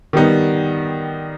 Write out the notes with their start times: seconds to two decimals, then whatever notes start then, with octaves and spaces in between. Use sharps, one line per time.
0.13 D#3 G3 B3 D#4